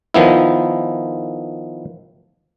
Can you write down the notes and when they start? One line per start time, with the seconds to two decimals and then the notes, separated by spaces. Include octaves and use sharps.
0.14 D#3 F3 B3 E4